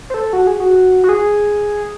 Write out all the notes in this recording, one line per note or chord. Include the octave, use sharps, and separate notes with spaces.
C5
A4
F#4
G#4
F#4
F#4
G#4